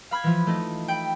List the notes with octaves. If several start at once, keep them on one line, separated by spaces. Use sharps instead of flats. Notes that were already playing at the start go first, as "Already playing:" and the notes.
F5 B5 F6 G#6
E3 F3
A3 D#4
G5 B5